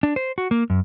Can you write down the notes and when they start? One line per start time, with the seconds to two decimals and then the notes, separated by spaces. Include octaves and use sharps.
0.03 D4
0.16 C5
0.38 F#4
0.51 A#3
0.70 F#2